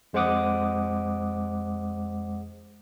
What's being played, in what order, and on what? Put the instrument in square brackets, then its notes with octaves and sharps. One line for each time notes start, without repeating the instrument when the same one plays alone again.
[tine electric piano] F2 G#3 C5 F#5 D6 D#6